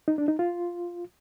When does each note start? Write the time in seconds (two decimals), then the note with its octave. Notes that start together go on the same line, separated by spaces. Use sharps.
0.08 D#4
0.18 D4
0.28 D#4
0.39 F4